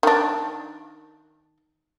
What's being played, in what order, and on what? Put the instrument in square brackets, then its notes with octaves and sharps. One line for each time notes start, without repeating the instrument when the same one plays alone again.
[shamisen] D#3 D4